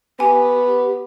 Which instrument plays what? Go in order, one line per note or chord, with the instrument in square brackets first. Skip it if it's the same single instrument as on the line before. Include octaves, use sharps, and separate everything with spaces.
[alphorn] B3 [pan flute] G4 [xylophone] G#5